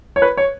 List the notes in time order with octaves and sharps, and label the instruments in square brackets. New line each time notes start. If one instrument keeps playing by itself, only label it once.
[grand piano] C#5
B4
C#5